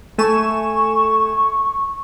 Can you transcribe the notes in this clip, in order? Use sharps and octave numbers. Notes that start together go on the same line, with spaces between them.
A3 G#5 C#6 E7